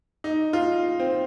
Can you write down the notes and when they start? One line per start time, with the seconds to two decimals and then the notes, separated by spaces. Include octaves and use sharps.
0.24 D#4
0.53 F4
1.00 C4